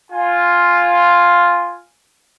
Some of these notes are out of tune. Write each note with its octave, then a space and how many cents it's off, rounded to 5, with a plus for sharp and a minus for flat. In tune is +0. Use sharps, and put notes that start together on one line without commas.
F4 +0 G#5 +0